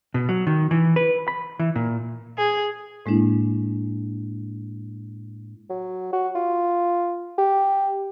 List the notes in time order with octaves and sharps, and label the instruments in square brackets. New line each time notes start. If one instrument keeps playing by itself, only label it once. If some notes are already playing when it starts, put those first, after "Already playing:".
[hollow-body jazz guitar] B2
F#3
D#3
E3
B4
B5
E3
A#2
[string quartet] G#4
[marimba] A2 G#3 A#3 D4 E4
[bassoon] F#3
F#4
F4
G4